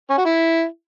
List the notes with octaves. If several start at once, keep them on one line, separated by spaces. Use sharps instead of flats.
C#4
F#4
E4